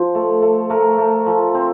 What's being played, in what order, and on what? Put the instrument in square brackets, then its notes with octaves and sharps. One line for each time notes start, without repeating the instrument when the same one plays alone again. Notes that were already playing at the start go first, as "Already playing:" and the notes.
Already playing: [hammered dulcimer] F3 C5
A3
A3
A3 A#4
A3
F3
C4